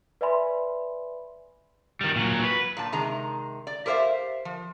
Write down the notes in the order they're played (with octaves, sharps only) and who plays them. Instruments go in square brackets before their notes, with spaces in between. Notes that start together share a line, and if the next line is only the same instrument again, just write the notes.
[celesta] B4 D5 E5 G#5 B5 C6
[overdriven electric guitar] D#3 G3
A#2 F#3
B4
[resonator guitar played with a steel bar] A#2 A5
C3 D#3 G#3 A#5
D5
G4 A#4 C5 C#5 E5 F5
F3